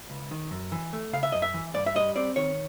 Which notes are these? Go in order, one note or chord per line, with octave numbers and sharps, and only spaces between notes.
C#2
D#3
F#2
E3
A3
C#3 F5
E5
F#2 D#5
E5
E3
G2 D5
E5
G3 D#5
C4 D5
D#3 C#5